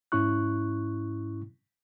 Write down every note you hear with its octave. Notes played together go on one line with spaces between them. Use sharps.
G#2 C#4 E4 C#6 F#6